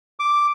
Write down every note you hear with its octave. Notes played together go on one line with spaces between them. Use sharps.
D6